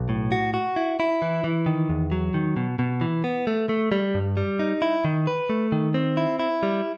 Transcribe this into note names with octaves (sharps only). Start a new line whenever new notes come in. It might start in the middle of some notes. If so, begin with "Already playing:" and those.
Already playing: B1
A2
F#4
F#4
E4
E4
E3
E3
D#3
E2
F#3
D#3
B2
B2
E3
B3
A3
A3
G3
G2
G3
D#4
E4
D#3
B4
A3
D#3
C4
E4
E4
G3